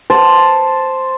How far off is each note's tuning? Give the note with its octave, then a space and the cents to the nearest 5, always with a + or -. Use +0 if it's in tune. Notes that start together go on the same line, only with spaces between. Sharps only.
C5 +0 A5 +0